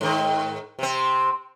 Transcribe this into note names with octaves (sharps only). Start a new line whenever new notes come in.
G#2 D#3
C3 C4